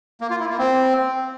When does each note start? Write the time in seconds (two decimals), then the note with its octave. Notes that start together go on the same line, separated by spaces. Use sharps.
0.21 A#3
0.30 F4
0.40 E4
0.49 A#3
0.58 C4